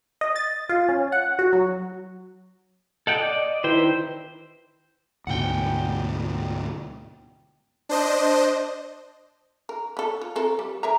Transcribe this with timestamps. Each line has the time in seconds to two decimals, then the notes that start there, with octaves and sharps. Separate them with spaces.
0.21 D#5
0.36 A6
0.69 F4
0.89 C#4
1.12 F#5
1.39 F#4
1.53 F#3
3.07 A4 D#5 F#5 G5
3.21 D5
3.64 D#3 E4 B4 C5 G5
5.27 D2 G#2 B2 F#5 G5
7.89 D4 C5 D#5
9.69 A#4
9.97 B3 A4
10.21 F4
10.36 C4 A4 A#4
10.59 G3
10.83 A#4 E5 A#5